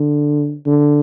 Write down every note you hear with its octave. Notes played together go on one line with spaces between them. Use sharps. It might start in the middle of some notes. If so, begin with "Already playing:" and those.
Already playing: D3
D3